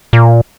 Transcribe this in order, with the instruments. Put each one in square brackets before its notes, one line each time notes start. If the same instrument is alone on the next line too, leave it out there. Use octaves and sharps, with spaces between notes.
[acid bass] A#2